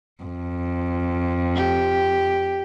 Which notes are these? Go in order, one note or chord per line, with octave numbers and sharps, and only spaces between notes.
F2
G4